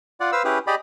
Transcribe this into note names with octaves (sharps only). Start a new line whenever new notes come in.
F4 D5 F#5
B4 C5 F5 E6
C#4 E4 G4 G#4 B4
G4 G#4 D5 D#5 B5